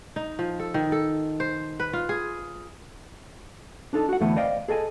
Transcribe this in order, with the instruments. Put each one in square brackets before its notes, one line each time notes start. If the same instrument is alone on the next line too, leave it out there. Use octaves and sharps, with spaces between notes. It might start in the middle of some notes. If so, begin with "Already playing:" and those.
[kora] D#4
F3
A4
D#3
A4
C5
B4
F4
G#4
[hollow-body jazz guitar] D4 D#4 A4 D#5
F#4 F#5
D2 A2 E3 A3 B3 F#5
C5 D5 D#5 F5 G5
G#4 A4 D#5 F5 G#5